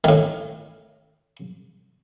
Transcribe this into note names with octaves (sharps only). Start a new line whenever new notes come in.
A2 D#3